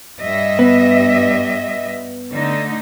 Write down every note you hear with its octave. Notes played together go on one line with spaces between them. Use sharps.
G2 D#5 E5
B3
D3 A3 D#4